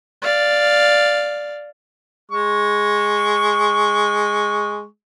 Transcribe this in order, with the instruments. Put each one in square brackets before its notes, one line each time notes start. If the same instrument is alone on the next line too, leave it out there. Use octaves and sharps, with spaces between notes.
[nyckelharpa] D5 F5
[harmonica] G#3 C#6